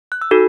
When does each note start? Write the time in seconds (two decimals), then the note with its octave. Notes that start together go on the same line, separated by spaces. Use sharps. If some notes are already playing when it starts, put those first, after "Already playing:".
0.12 F#6
0.22 E6
0.31 D#4 F#4 A4